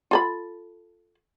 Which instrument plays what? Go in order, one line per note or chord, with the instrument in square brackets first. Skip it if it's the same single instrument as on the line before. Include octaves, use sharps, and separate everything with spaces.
[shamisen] F4 A4 B5